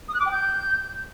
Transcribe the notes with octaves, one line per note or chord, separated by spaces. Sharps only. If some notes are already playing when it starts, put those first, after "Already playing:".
D#6
F#6
D6
G5
G6